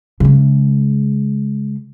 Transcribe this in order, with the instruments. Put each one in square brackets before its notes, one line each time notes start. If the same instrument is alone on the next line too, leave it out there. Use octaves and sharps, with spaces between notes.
[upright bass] C#3 G#3